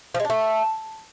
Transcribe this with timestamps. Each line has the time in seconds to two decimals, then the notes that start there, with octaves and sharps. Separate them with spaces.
0.15 F3
0.20 G#3
0.25 D4
0.30 A3